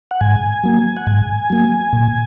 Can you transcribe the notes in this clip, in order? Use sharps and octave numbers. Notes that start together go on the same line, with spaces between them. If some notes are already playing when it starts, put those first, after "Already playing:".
F#5
G#2 G#5
F#3 A#3
F#5
G#2 G#5
F#3 A#3
A#2